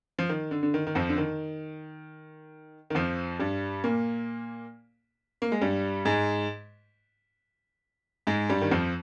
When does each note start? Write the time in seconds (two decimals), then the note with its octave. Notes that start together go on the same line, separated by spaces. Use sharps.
0.19 F3
0.29 D#3
0.51 D3
0.63 D3
0.74 D#3
0.87 D#3
0.95 F2 F3
1.09 D3
1.18 D#3
2.90 D#3
2.95 F2 F3
3.39 G2 G3
3.84 A#2 A#3
5.42 A#3
5.52 G#3
5.61 G2 G3
6.05 G#2 G#3
8.27 G#2 G#3
8.49 G2 G3
8.62 D#3
8.71 F2 F3